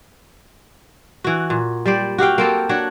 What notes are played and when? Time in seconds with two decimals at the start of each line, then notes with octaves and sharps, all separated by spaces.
1.24 E3 F#4
1.50 A#2
1.86 G3 C5 D5
2.18 F#4 G4 F5 G5
2.38 A#3 C4 A4
2.69 D4 F#4 C#5